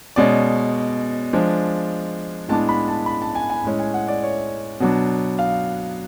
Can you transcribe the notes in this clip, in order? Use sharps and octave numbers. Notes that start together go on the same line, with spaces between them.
B2 G#3 C#4 D5
F3 G#3 D4
A2 G#3 B3 D4 A5
B5
A5
B5
A5
G#5
G#5
A2 G#3 C#4
G#5
F#5
D5
C#5
B2 F#3 B3 D4
F5